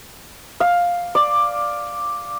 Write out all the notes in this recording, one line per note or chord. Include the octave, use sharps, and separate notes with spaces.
F5
D5